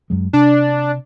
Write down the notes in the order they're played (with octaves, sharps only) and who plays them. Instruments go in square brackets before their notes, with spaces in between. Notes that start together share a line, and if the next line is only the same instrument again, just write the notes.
[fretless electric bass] F#2 F#3 G#3
[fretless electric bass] C3 [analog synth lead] D4